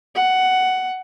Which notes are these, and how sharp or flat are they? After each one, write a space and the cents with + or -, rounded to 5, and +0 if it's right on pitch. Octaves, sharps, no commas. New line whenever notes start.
F#5 +10